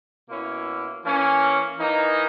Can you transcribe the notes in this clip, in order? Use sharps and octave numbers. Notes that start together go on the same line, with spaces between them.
B2 A#3 C#4 E4
E3 A#3 C#4
E3 A#3 D#4